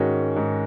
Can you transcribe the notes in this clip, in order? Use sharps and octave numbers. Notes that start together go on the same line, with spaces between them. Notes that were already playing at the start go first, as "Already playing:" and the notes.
Already playing: G#2 D#3 G#3 C#4 F#4
G#2